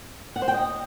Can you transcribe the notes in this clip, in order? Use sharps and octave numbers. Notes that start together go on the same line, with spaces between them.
F#5
C5
G5
D#5